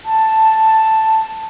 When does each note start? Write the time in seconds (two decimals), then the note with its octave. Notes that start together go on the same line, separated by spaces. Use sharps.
0.05 A5